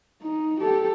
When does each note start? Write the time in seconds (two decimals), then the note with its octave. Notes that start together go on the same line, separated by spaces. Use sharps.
0.22 D#4
0.60 G4 A4